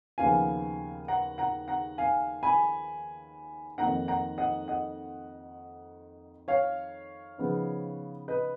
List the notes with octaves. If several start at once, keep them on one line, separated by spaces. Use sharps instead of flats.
D#2 C#3 F3 B3 F5 G#5
F#5 A#5
F#5 A#5
F#5 A#5
F5 G#5
G#5 B5
F2 D#3 A#3 D#4 F#5 A#5
F#5 A#5
D#5 F#5
D#5 F#5
C#5 F5
C#3 F3 B3 D#4
B4 D#5